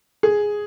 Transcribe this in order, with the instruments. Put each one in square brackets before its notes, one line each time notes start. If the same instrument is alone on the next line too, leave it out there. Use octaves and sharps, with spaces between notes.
[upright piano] G#4